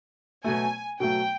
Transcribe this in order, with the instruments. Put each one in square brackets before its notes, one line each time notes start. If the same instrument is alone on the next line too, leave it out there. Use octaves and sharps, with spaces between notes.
[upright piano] B2 F#3 A3 [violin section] G#5
[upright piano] B2 F#3 A3 [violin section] G5